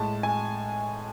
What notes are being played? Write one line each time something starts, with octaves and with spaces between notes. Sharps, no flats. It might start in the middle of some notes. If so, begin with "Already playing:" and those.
Already playing: A2 G#3 A5
G#5